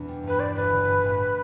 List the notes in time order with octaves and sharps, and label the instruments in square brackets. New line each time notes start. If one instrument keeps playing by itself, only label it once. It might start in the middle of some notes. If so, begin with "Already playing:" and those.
Already playing: [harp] E2 B2 B3 D4
G3
[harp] G2 [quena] B4
[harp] B3 [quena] D5
[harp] G1 [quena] B4
[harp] D3
G2
A1